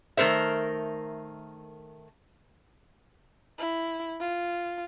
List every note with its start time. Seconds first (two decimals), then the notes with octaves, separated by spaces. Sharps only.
0.17 D#3 A3 A#4 C5 E5
3.59 E4
4.20 F4